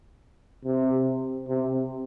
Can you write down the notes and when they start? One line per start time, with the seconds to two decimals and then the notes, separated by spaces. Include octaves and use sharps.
0.65 C3
1.49 C3